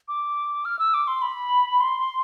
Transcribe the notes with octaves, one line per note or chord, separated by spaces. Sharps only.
D6
F6
E6
D6
C6
B5
C6